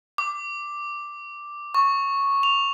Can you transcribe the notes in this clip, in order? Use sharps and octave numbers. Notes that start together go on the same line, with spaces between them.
D6
C#6
F7